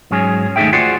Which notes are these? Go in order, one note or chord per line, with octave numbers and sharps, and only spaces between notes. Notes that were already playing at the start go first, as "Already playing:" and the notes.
G#2 F#3 C#4 G#4
D#2 A3 D#4 G#4 E5 G5
F4 F#4 G#4 C5 D5 F#5